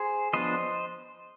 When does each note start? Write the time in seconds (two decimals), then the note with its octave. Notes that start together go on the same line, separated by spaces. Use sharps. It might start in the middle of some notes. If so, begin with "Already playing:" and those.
Already playing: G#4 C5
0.33 F3 B3 D4 C5 D#5